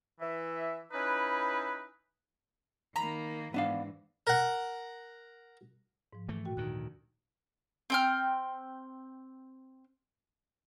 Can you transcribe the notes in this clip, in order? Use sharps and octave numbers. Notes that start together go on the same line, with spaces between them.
E3 E5
C#4 D#4 E4 B4
D#3 A#3 A#5 B5
G#2 E3 B3 D4 F5
A#4 F#5
G#2 F3
E3 A3
A#2 F#4 G5
D2 D#3 F#6
C4 G5 F6